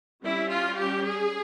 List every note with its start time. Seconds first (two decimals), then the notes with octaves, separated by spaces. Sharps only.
0.21 G3 C#4 E4
0.49 F4
0.78 G4
1.06 G#4